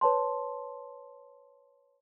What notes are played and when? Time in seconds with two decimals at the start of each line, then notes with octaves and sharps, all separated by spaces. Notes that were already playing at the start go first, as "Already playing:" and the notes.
0.01 B4 C#5 A5 C6